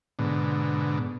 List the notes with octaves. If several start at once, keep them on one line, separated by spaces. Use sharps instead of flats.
G#2 B2 D3